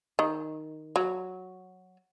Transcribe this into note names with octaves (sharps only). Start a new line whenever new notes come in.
D#3
F#3